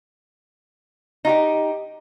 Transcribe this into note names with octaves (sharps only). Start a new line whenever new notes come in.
D#4 F4 G4